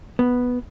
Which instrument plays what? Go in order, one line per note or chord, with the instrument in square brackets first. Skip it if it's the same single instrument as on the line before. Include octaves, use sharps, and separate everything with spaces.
[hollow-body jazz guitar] B3